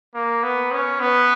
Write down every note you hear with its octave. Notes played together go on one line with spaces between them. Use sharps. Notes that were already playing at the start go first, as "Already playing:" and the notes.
A#3
B3
C#4
B3